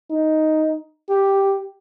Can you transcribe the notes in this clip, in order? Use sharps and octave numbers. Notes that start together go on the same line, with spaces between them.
D#4
G4